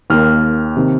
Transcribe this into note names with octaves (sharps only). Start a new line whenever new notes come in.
D#2 D#3 A#3 F6
C3 D#3 C4